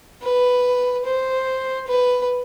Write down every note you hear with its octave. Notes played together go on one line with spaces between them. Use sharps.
B4
C5
B4